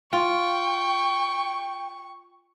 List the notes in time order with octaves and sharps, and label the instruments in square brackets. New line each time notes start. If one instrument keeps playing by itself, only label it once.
[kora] F4 [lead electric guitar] G5 [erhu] C#6